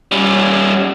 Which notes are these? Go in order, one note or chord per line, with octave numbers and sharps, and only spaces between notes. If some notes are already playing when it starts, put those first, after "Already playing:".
G3 C#4